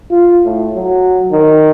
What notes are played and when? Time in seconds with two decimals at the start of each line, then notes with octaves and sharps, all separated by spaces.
0.10 F4
0.45 A2
0.76 F#3
1.32 D#3